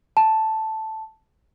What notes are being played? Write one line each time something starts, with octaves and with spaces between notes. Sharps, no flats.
A5